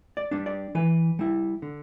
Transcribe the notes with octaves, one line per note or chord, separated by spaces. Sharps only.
D5
G3 D4
D5
E3 B4
G3 E4
D3